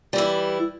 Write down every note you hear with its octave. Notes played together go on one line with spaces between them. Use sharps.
E3 G3 E4